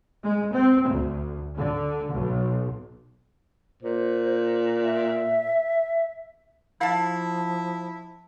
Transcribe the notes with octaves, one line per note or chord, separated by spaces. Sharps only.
G#3
C4
D2
D3
B1
A#2 C5
E5
F3 E4 F5 A5